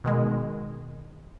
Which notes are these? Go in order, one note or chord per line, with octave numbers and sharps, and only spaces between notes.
B2 D#3 G#3